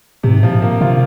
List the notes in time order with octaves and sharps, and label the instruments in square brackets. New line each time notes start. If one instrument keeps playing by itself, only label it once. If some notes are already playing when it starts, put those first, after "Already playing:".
[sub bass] G#2 [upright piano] C3
[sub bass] A#2 [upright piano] F3
[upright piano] A#3
[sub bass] C3 [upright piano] F4